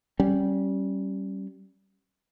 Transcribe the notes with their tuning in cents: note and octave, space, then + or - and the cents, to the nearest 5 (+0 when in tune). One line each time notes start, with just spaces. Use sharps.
G3 -20 C#4 -15